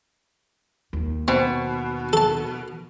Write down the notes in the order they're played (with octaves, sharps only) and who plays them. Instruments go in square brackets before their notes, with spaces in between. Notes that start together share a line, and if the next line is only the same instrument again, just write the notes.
[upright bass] D#2
[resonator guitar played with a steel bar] B2 [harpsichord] C4
[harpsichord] A4 A5